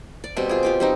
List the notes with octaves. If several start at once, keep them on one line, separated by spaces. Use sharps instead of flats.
D5
B2 G3 C4
F4 G#4
F4 G4 D6
G3 C4 D#4